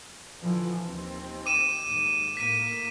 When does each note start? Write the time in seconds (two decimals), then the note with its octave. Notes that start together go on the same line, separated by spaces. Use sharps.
0.39 D3 E3 F3
0.84 D#2 C4
1.46 D6 D#7 E7
1.86 D#2 G#2
2.37 A2 A#3 B6 D#7